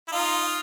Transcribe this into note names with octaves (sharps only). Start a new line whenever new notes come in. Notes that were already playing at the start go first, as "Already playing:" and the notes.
E4
D#4 F4 F5